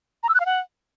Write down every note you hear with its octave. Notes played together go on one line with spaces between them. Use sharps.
A#5
E6
F#6
F5
F#5